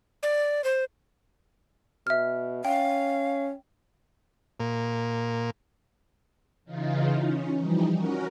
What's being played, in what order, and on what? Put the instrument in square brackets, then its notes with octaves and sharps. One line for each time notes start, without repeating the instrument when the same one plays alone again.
[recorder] D5
C5
[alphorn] B2 [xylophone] E5 F6
[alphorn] C#4 [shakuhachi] F5 [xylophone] G5
[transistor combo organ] A#2
[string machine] C#3 E3 D#4 F4
C#4
E3 F3 G3 D#4
C#4 F#4 A#4